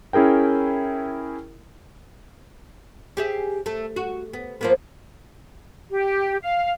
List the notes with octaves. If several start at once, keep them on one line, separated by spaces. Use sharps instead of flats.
C#4 E4 G#4 A#4 G5
G4 G#4 E5
A3
F#4
B3
F3 A#3 B3
G4
F5